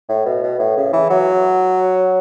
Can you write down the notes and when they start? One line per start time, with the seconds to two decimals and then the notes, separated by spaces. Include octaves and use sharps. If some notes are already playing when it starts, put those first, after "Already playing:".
0.09 A2
0.25 B2
0.43 B2
0.59 A2
0.77 C#3
0.93 E3
1.10 F#3